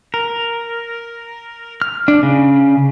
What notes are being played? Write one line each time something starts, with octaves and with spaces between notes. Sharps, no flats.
A#4
F6
D4
C#3